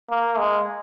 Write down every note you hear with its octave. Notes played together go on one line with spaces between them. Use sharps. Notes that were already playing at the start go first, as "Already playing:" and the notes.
A#3
G#3